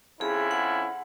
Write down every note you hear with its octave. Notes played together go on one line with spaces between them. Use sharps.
F2 C#4 E4 G#4
F#5